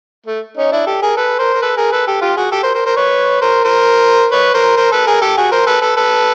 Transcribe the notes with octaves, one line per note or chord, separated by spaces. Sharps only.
A3
C#4 D#4
D4 E4
G4 A4
G#4 A#4
A4 B4
A#4 C5
A#4
A4 B4
G#4 A#4
A4 B4
G4 A4
F4 G4
F#4 G#4
G4 A4
A#4 C5
A#4 C5
A#4 C5
B4 C#5
A#4 C5
A#4 C5
B4 C#5
A#4 C5
A#4 C5
A4 B4
G#4 A#4
G4 A4
F#4 G#4
A#4 C5
A4 B4
A4 B4
A4 B4